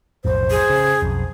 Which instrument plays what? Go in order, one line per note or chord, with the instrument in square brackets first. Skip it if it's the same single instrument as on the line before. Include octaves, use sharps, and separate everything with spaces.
[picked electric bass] B1 F2 A2 [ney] C5
[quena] G#4
[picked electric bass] C#3
B1 F2